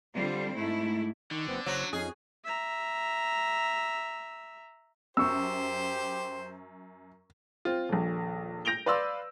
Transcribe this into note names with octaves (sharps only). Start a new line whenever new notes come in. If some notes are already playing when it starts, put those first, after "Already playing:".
D3 G3 C4 F4 C5
G#2 A3 E4
D3 D#3 C#6
F#1 B3 C4
F#1 F#3 C5 C#5
F2 C#4 D#4 G#4
E5 A#5
F#2 G4 C5 C#6 E6
C4 F4
D#1 A#1
G6 A#6 D7 F7 G7
B4 D5 F5 C6 E6